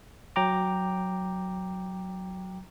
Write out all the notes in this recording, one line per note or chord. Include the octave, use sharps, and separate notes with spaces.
F#3 G5 A#5 D6